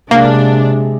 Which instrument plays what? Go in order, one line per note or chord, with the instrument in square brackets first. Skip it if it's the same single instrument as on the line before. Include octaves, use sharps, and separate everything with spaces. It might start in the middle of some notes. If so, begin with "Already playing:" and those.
[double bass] C3 G#3 [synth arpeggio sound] A#3 [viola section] D4